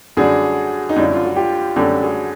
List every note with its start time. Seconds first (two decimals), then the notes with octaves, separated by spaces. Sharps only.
0.17 F#2 D3 G3 F#4 G#4
0.89 D#4
0.96 F#2 D3 G3 E4
1.13 F4
1.25 F#4
1.36 F4 G4
1.76 F#2 D3 G3 G4 A4
2.02 F#4 G#4